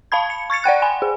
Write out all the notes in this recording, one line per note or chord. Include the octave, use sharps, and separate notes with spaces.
F5 A5 B5 G#6
C#7
C#6 G#6 A6 C#7
D5 F#5 G5 F#6
G#5 B5
G#4